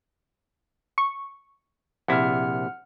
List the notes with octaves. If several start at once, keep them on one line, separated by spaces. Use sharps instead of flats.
C#6
A#1 C3 E4 F#5 F6